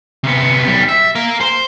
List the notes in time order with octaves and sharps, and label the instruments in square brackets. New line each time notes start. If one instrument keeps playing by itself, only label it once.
[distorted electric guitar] C3 B3
B1 G3
E5
A#4 F5
C5